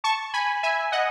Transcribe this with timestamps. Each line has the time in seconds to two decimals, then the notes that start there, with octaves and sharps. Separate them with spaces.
0.04 A5 C#6
0.34 G#5 B5
0.63 E5 G#5
0.92 D#5 F#5